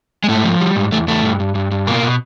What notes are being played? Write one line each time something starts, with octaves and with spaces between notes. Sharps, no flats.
G#3
G#2 A3
F3
G3
G#2
E2 A3
E2 A3
G2
G2
G2
G2
B2 A#3
B2